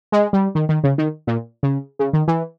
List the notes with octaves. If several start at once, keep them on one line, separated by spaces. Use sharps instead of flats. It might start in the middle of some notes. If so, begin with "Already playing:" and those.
G#3
G3
D#3
D#3
C#3
D#3
A#2
C#3
C#3
D#3
E3